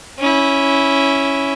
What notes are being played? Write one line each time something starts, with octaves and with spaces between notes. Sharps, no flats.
C#4 E4